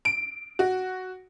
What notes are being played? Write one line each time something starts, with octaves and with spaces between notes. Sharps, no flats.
D7
F#4